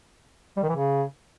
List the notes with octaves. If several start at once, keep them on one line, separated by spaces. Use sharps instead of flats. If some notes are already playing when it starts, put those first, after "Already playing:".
G3
D#3
E3
C#3